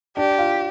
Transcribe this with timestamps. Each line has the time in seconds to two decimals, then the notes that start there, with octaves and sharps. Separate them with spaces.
0.17 D4 G4
0.38 F4